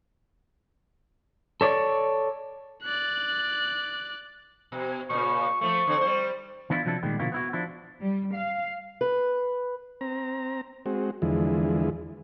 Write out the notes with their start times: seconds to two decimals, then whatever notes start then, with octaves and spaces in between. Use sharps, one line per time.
1.61 A4 C#5 D5
2.83 D5 F#6
4.72 B2
5.10 A#2 C#3 C#6
5.61 F3 A3 C#6
5.87 D3 C4
6.01 G3 C4 C5
6.70 E3 B3 D4 E4 F4
6.85 C3 F3 F#3 D4 E4 A4
7.03 A#2 D#3 G3 G#3 B3
7.19 B2 D3 F3 A#3 E4 F#4
7.32 B3 E4 F#4
7.53 F3 D4 E4
8.02 G3
8.34 F5
9.01 B4
10.01 C4 A#5
10.86 G#3 C4 F#4
11.22 E2 D3 E3 F3 G#3